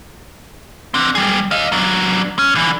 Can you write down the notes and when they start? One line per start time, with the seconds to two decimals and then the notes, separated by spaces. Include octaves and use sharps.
0.94 C4 D4
1.15 G3 G#4
1.51 D#5 F5
1.72 F#3 D4
2.39 C#4
2.55 D3 E3